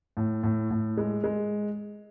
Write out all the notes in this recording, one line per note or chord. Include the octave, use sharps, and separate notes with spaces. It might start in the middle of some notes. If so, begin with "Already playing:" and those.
A2
A2
A2
G#3
G#3